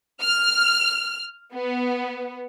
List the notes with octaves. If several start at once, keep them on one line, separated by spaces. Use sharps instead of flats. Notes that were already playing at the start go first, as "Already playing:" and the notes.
F6
B3